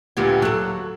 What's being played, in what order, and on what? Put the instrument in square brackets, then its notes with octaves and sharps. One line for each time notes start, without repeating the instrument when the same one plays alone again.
[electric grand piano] D2 A#2 G#6 [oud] B3 G4
[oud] F#3 A4 [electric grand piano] E6 F#6